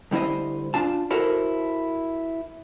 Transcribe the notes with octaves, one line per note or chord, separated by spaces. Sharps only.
D2 G3 E4 C5 D#5
D4 F4 A5
E4 F#4 A4 A#4 C5